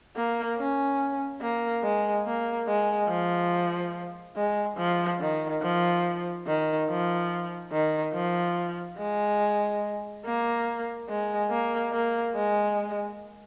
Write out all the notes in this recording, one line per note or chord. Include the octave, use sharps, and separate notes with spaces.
A#3
C#4
A#3
G#3
A#3
G#3
F3
G#3
F3
D#3
F3
D#3
F3
D#3
F3
G#3
A#3
G#3
A#3
A#3
G#3